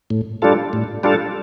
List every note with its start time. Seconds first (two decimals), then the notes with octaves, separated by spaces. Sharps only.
0.10 A2
0.42 G3 D4 F4 A4
0.73 A2
1.03 G3 D4 F4 A4